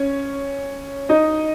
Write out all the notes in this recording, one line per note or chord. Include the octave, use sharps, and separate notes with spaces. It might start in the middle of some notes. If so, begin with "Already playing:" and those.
Already playing: C#4 C#5
D#4 D#5